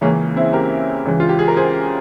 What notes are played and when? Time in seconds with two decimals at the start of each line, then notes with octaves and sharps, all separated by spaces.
0.01 C#2 C#3 E3 A#3 C#4
0.36 C4 E4
0.53 G4 A#4
1.05 C#2 C#3 E3
1.20 F4
1.29 G4
1.39 G#4
1.48 A#4
1.57 G#4 C5